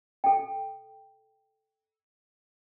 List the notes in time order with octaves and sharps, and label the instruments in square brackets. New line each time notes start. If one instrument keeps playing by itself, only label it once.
[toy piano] A4 G5